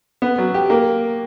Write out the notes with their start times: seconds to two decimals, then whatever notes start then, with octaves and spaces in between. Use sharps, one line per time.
0.22 B3
0.38 F#3
0.54 G4
0.70 A#3